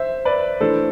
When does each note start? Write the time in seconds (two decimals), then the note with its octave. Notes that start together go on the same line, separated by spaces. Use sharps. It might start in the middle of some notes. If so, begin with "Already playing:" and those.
Already playing: C5 E5
0.25 B4 D5
0.61 E3 A3 D4 A4 C5